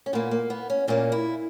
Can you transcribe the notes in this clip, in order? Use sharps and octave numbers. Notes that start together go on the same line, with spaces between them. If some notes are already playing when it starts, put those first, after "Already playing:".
C#4
A#2 A#3 B3
A#3
B3
C#4
A#2 A#3 C#4
E4